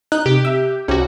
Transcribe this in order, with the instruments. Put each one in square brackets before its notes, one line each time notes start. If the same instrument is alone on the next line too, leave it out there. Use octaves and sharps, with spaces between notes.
[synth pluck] D#4 [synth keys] F#6 G6
[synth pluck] C3 [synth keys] G4
[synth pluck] E5
[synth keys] C2 F#4 [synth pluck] C#4 G4